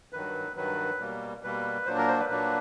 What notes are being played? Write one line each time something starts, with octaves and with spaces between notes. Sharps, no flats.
G2 D#3 F#3 B4
G2 D#3 F#3 B4
B2 G3 A#3
B2 G3 A#3 B4
A#2 F#3 A#3 D4 C5
A#4
C5
B4
A#2 F#3 A#3 D4 B4